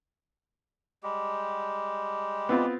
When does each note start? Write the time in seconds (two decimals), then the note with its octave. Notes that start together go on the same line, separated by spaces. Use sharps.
1.03 G3 G#3 G4
2.49 B3 C4 F4